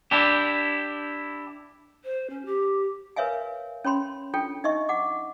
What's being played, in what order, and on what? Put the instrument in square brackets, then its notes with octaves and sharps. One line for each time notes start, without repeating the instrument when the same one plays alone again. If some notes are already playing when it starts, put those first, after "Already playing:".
[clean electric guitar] D4 E4 G4
[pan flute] C5
C#4
G4
[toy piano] A#4 B4 C#5 E5 F5 G#5
C#4 C#5 B5 C6
D4 F4 A4 G5
D#4 D#5 E5 C#6
F#5 D6